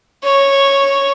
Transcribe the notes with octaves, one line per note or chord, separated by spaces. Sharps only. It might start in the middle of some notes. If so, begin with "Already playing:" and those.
C#5